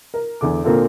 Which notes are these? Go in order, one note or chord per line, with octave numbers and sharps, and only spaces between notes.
A#4
E2 D3 D6
A#2 D3 A#3 C4 F4 A4